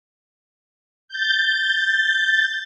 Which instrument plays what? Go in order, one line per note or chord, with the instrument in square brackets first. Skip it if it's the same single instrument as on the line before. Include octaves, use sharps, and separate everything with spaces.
[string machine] G6 A6